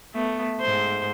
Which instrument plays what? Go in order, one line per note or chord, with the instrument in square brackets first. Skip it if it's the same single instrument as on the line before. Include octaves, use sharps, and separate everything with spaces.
[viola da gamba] A3 B3
G#2 C5